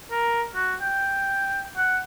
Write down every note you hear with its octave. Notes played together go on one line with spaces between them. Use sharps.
A#4
F#4
G5
F#5